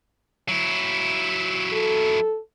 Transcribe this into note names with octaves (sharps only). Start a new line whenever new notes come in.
F#3 E4
A4